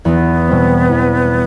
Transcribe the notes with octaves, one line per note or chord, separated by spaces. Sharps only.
E2 B3
B2 G3 C4
E2